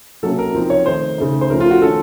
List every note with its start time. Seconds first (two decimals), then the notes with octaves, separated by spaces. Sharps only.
0.23 C3 F#3 A#3 C#4 A4
0.39 A#4
0.55 F3 C4 D#4
0.70 C#5
0.86 D#3 A3 D#4 C5
1.18 C#3 A3 D#4
1.41 C5
1.50 F3 A3 C#4 A#4
1.60 F4
1.71 F#4
1.81 D#3 A3 C#4 A4